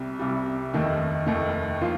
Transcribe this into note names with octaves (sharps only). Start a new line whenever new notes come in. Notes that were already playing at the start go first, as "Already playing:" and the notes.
Already playing: C2 C3 G3
C2 C3 G3
F1 D#2 D#3 A3
F1 D#2 D#3 A3
F3 A#3 F4